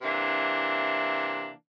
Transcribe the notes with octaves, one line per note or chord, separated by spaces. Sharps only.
C3 E3 A#3 D4